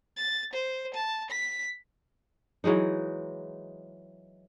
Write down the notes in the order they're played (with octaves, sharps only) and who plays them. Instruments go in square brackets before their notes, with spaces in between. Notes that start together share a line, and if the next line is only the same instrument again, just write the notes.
[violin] A6
C5
A5
B6
[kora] E3 F#3 G#3 D#4